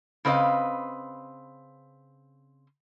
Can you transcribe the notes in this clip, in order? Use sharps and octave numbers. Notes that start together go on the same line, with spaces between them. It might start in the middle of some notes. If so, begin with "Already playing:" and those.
C#3 C4 B4 D#5 F5